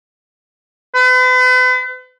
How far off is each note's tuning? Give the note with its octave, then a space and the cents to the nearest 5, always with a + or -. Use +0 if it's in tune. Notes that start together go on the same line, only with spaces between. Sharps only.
B4 +40